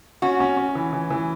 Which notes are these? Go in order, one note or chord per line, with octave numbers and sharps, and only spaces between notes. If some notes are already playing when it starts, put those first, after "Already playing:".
C#4 F#4
C#4
C#4
E3
E3
E3